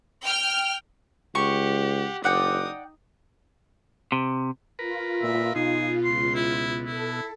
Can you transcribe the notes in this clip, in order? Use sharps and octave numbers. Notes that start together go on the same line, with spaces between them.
G5 F6
C#2 G4 F#5 C#6
F#1 D#4 D5 F#5 G5 D#6
C3
F4 A#4 B4
A#2 E5
B2 D#4 G#4
C#2 C6
E4
E4 A4